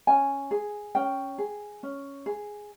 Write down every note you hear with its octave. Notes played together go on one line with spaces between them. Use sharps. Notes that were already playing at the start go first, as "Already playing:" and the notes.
C#4 G#5
G#4
C#4 G5
G#4
C#4
G#4